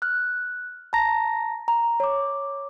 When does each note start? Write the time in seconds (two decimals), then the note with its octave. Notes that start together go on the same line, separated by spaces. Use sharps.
0.02 F6 F#6
0.93 A5 A#5 A#6
1.68 A#5
2.00 C#5 D6